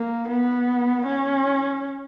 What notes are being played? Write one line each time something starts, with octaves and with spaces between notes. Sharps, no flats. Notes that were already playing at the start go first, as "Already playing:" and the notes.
Already playing: A#3
B3
C#4